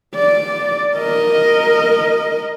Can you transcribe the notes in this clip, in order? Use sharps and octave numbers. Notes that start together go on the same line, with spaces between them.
D5
A#4 D#5